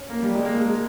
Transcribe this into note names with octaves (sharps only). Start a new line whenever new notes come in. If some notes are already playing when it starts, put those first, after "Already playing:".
Already playing: C#4
A#3
G3
G#3
A#3
G#3
G#3